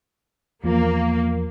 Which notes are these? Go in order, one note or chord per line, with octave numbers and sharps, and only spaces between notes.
E2 F3 A#3